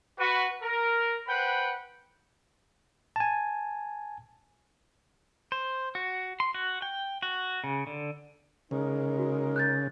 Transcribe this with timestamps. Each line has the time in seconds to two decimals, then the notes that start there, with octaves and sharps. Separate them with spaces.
0.18 F#4 B4
0.62 A#4
1.27 B4 C5 F#5 G5 B5
3.16 G#5 A5
5.52 C5
5.95 F#4
6.40 C6
6.55 F#4
6.82 G5
7.23 F#4
7.64 C#3
7.87 D3
8.71 C#3 G#3 D#4 A#4
9.18 F#4
9.56 F#6 G6 A6